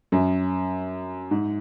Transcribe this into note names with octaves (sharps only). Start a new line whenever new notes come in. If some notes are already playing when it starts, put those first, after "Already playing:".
F#2
G#2